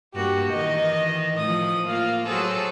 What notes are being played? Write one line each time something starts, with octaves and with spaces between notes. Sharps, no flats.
G2 A#3 F#4 G4
D#3 E3 D#4 D#5
A2 F3 D#6
A#3 F4 F5
F#3 G#4 A4 C5